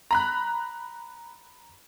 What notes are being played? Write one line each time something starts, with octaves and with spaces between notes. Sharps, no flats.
A#5 B5 F#6